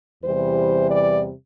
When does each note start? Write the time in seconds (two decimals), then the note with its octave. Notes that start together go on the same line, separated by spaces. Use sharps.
0.24 E2 C3 E3 G3 C5
0.91 D5